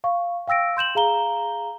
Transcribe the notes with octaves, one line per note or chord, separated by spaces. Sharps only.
F5 C#6
F5 G5 E6 A#6 D7
C6 G6 E7 F#7
G#4 F5 A#5 G7